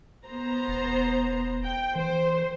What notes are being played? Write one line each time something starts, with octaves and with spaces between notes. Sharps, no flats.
B3 C5 A#5
E1
G5
E3 C5